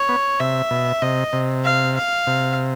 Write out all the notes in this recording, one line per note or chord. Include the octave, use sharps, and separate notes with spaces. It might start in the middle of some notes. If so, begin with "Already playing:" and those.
Already playing: C#5
B3
C3 E5
B2
C3 D#5
C3
F5
F5
C3